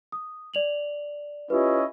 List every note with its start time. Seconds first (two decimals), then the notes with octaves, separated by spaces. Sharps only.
0.12 D#6
0.54 D5 F7 F#7
1.50 C#4 E4 F4 G4 B4 D#5